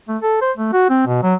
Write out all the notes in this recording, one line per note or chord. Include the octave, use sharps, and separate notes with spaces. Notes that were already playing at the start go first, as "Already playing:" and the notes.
A3
A4
C5
A3
F#4
C4
B2
F#3